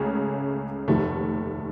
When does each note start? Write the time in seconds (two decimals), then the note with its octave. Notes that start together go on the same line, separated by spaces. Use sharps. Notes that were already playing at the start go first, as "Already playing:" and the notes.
Already playing: C#2 C#3 A3 C#4
0.88 F1 D#2 D#3 A3